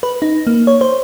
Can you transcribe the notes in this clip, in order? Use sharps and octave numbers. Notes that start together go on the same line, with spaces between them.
B4
D#4
A#3
C#5
C5